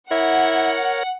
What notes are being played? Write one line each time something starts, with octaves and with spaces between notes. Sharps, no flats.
E4 A#4 C#5 F#5